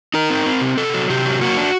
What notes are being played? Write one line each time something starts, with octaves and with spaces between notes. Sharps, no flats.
D#4 A#4
C4
C4
C3
C3 A4
F#3
C3 G4
F#3
A#3 F#4
D4